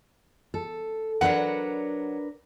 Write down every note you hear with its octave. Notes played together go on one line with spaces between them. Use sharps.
A4
F#3 D4 A#4 B4 F#5